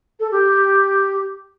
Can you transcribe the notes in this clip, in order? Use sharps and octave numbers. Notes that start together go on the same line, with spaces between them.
A4
G4